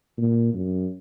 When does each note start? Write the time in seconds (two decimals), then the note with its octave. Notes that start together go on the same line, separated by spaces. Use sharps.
0.18 A#2
0.54 F#2